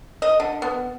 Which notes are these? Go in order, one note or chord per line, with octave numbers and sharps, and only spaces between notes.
D#5
D3
B3